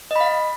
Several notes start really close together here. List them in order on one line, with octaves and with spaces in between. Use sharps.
D#5 B5 F5